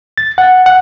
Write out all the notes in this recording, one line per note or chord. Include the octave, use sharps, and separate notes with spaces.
A6
F#5
F#5